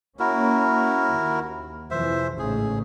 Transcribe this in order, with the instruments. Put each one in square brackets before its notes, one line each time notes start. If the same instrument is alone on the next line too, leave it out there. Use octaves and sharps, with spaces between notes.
[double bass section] A#3 C#4 [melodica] E4 F#4 A#4
[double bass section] D#2
[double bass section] F2 C3 E3 [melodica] C5 E5
[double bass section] A1 G#2 C#3 [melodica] G#4